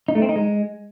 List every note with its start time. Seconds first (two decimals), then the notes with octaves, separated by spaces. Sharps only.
0.08 D#4
0.15 A3
0.22 C4
0.29 D#4
0.36 G#3